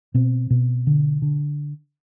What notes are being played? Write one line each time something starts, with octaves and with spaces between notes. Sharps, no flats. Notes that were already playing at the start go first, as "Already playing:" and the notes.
B2 C4
B2
D3
D3